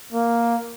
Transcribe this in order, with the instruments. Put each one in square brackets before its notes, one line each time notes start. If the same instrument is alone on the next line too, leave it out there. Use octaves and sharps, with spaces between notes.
[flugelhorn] A#3